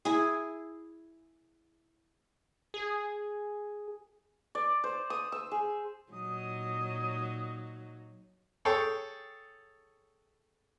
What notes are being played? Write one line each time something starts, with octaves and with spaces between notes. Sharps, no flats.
E4 G#4
G#4
D5
C5
D#6
E6
G#4
A#2 F#3 D#4 D#6
G#4 A4 C#5 G5